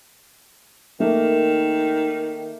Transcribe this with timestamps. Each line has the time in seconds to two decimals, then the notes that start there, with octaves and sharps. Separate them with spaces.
1.00 D#3 A3 A#3